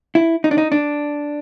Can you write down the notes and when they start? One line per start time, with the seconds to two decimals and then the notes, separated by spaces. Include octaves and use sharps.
0.15 E4
0.44 D#4
0.51 D4
0.58 D#4
0.72 D4